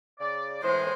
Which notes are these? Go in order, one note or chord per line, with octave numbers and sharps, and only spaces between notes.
C#3 D5
A2 E3 G#3 C5